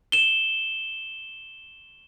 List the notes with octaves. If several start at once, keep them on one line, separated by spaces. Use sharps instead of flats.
E7 G7